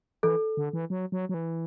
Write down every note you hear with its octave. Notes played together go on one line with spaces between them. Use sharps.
E3 A4
D3
E3
F#3
F#3
F#3
E3